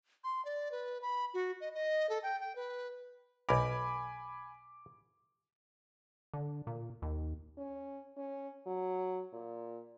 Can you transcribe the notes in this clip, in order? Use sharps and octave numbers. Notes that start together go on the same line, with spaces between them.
C6
D5
B4
B5
F#4
D#5
D#5
A4
G5
G5
B4
B1 A#4 G#5 B5 D6
D3
A#2
D#2
C#4
C#4
F#3
A#2